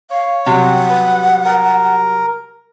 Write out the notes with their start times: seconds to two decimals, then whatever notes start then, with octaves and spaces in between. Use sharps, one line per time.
0.11 C#5 F5
0.46 C3 F#3 G3 F#5
0.90 B4
1.45 A#4